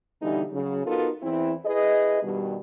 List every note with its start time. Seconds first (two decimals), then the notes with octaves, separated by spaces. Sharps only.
0.21 B2 D3 E3 G3 D#4
0.52 C#3 F#3
0.85 B3 D#4 F4 F#4 A4 A#4
1.22 E2 E3 C4 E4
1.64 E4 G#4 B4 D#5
2.22 G2 B2 D#3 G3